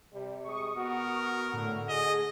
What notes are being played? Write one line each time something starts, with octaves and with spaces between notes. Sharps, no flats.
C3 G3
G#3 C#6 D#6
B3 F#4 A#4
F#4
A2 D3
G#4 D#5